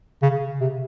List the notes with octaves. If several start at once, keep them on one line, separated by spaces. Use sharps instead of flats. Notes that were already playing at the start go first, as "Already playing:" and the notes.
C#3
C3